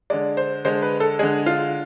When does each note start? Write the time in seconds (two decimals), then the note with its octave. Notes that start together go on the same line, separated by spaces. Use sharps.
0.10 D3 G#3 D5
0.37 C5
0.65 D3 G#3 C5
0.82 B4
1.00 A4
1.19 D3 G#3 G#4
1.46 F4